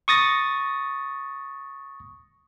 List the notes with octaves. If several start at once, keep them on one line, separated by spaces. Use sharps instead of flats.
C#6 D#6 A6 A#6